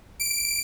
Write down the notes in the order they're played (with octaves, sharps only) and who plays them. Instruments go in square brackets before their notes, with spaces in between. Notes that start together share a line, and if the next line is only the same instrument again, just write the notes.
[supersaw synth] D7